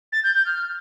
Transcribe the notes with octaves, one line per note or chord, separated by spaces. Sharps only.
A6
G6
G6
F6